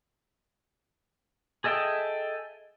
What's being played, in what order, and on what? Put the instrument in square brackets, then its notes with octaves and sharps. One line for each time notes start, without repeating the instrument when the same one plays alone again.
[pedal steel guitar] G#4 A4 D#5 E5 G5